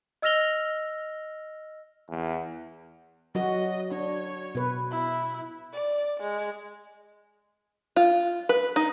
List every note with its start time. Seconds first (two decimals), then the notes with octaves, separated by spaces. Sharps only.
0.22 D#5 E6 F6 A#6 F7 G7
2.10 E2
3.35 F#3 F#4 D#5
3.92 D4 C#5
4.55 B2 B4
4.91 E4
5.73 D5
6.20 G#3
7.96 F4
8.49 B4
8.76 D#4